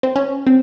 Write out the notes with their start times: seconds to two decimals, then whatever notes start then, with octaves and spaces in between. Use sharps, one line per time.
0.03 C4
0.16 C#4
0.47 C4